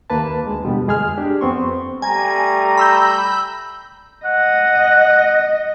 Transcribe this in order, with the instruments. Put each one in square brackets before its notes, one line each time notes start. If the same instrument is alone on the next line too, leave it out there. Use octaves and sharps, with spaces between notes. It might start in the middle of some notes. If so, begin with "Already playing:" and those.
[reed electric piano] D#2 A#3 B4 A5
D2 G#3
E2 B2 D3 G3 B3
F2 G#3 G#4 G#5 F6
D4 G4
F2 B3 C4 C6 C#6
[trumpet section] G3 A3 [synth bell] G#5 [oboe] A#5
[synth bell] B5 E6 G6
[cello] D#5 [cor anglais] F#5